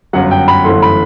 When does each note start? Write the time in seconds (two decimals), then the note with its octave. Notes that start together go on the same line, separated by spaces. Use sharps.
0.13 G1 F#2 F#3 F#5
0.31 G5
0.48 B5
0.64 G1 F#2 E3 A3 C6
0.82 B5